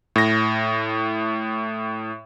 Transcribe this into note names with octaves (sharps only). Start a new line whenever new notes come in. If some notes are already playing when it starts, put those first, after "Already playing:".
A2 A#6